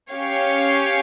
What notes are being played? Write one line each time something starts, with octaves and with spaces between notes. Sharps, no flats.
C#4 G4 C#5 F5